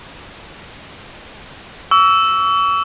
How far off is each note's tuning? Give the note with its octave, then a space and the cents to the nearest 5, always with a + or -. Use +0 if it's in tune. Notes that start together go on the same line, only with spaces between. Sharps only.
C#6 +40 E6 +0